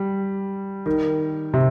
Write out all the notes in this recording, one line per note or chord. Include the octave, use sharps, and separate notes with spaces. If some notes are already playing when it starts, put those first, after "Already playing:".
Already playing: G3
D#3
C3